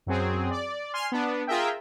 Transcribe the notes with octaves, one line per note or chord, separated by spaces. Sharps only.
F#2 F#3 C4 G#4
D5
G#5 C6 F6
B3 D4
F4 G#4 A#4 E5 G5